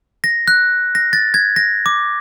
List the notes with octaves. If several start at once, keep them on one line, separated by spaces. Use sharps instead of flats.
A#6
F#6
A#6
A6
G#6
A#6
D6